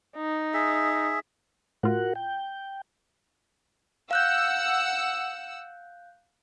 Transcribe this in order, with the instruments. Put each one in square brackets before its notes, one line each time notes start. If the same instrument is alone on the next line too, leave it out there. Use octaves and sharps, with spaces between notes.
[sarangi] D#4
[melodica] G#4 E5
[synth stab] A2 F4 [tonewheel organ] F#4 A#4 F#5
[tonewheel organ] G5
[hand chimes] F5 F#6 G6 [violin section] F#5 E6